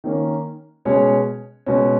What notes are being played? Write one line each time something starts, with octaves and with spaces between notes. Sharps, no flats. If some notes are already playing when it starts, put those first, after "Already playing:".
D#3 A#3 C#4
B2 G#3 C#4 G#4 C#5
B2 G#3 C#4